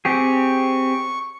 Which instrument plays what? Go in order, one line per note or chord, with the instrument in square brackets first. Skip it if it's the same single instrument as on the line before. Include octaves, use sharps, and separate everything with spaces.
[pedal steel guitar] C4 G4 G#4 [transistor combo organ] C#6